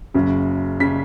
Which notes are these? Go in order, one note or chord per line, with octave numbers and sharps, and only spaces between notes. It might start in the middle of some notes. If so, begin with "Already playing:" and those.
F#1 F#2 C#3
C#3 B6